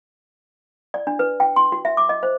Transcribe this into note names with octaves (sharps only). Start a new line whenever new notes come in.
D5
D4
B4
G5
C6
F#4
E5
D6
D#5
C5